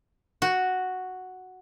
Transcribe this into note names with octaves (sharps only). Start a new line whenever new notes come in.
F#4